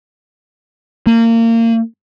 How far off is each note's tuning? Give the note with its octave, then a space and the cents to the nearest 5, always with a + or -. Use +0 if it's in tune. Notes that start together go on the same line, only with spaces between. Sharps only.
A#3 -30